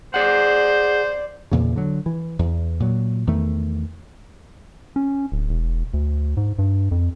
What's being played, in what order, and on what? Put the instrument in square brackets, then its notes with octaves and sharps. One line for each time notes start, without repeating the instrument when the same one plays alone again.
[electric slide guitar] G#4 F#5 [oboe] C5 [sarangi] D5
[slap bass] E2 A#2 C#3
D3 F#3
E3
E2
A#2 F#3
E2 D#3 A3
[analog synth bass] C#4
D1
E1
D2
G#2
G2
F2